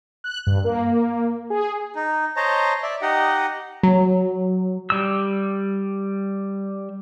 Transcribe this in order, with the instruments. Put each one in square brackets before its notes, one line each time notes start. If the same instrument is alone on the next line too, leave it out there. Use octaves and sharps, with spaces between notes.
[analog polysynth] F#6
G2
A#3
G#4
[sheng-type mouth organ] D#4
C5 C#5 D#5 A5 A#5
D5 E5
D#4 G4 D#5 F#5
[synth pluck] F#3
[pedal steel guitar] G3 E6